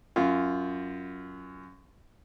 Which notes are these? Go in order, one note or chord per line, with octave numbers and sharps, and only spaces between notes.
F#2 F4